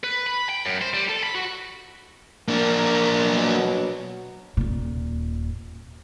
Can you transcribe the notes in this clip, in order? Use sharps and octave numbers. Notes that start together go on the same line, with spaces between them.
B4
B5
G5
F#2
C5
G3
A4
B5
F#4
A#3 D4 A#4
B2 F#3
D#1 A#2